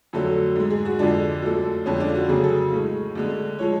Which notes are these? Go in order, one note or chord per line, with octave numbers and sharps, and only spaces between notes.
F2 D3 F#3 A3
G#2 G#3
G#4
F#4
F2 D3 F3 G#3 D4
F#2 F3 A3
F2 D3 G#3 C#4
D4
F4
F#4
D2 C#3 F#3 G#4
A4
A2 G#3
D2 D3 G#3
F3 G#3 C#5